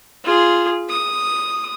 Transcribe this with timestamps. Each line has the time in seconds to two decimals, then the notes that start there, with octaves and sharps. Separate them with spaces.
0.24 F4 G#4
0.89 D#6